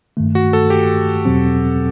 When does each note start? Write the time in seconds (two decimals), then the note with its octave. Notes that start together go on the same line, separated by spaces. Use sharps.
0.17 G2 D#3 A3
0.35 F#4
0.53 A4
0.70 G4
1.25 E2 B2 F#3 C4